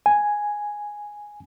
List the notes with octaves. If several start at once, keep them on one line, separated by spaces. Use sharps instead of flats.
G#5